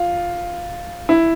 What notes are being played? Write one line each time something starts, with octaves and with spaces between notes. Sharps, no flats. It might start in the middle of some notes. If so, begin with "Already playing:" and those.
Already playing: F4
E4